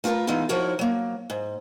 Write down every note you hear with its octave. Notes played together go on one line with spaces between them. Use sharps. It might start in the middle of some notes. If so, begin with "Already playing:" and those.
A3 F4 G4 A#4 B4
E3 G#3 B3 D#4 F4
F3 D#4 E4 F#4 A#4 C#5
F#3 A#3
G#2